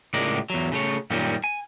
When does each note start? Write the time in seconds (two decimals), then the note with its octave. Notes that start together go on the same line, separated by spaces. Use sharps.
0.14 C#2 A2 G#3 A#4 D5
0.50 E2 F#3
0.72 C#3 A3 C#5
1.10 F#2 A#2 D#3 G3 C#4
1.44 G#5